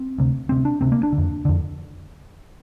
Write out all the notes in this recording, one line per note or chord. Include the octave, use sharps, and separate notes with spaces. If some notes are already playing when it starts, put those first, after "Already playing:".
Already playing: C4
D2 C3
D2 C3 C4
D4
D2 C3 C4
A#3
D4
D3
F2
F2 D3